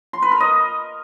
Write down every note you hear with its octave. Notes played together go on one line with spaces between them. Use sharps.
C6
B4
A#4
D#5